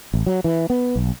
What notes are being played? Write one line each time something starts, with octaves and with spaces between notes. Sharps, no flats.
A1
F#3
E3
B3
B1